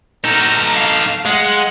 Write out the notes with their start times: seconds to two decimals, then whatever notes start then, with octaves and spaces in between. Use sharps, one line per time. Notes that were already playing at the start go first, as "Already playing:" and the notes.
0.24 D#4 A4 A#5 F6
0.73 F5
1.25 G#3 F5 F#5